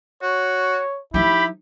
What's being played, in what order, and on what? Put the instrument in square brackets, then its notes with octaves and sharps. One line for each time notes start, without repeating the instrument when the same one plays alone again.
[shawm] F#4 [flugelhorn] C#5
[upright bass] F3 D#4 [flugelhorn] E4 [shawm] G4 [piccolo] B5